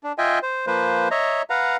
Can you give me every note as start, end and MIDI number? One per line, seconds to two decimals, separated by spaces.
0.03 0.12 62
0.18 0.39 65
0.18 0.39 75
0.18 0.39 76
0.18 0.39 79
0.18 0.39 80
0.43 0.66 72
0.67 1.09 53
0.67 1.09 58
0.67 1.09 71
0.67 1.09 72
1.11 1.42 73
1.11 1.42 75
1.11 1.42 76
1.11 1.42 82
1.50 1.77 71
1.50 1.77 77
1.50 1.77 78
1.50 1.77 82